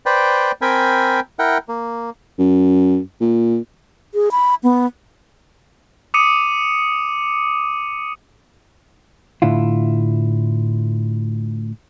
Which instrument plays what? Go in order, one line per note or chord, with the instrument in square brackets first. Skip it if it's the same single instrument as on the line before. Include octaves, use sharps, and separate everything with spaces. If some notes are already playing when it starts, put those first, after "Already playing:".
[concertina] B4 C5 D5 G5
C4 A#4 G5 G#5 B5
E4 A#4 F#5 G5
A#3
[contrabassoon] F#2
A#2
[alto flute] G#4
B5
B3
[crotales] D6 D#6 C#7 D#7
[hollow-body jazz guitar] A2 D3 E4 F4